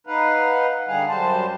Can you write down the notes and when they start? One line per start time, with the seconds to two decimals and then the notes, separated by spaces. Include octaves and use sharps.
0.07 D#4 B4 F5 F#5
0.88 D3 G3 G#4 F5 F#5
1.08 F#2 G3 C5 A5